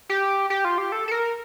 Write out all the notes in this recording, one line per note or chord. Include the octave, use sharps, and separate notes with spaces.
G4
G4
F4
G4
A4
A4
A#4